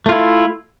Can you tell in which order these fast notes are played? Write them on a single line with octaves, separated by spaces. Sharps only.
A3 F4 E4